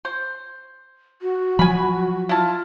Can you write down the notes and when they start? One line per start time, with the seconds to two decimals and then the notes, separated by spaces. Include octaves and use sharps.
0.05 C5
1.22 F#4
1.59 F3 F#3 G#5 B5
2.29 E4 F4 A5